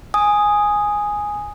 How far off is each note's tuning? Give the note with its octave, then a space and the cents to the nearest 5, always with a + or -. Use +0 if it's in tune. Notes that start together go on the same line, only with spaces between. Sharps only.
G#5 +0 D#6 +0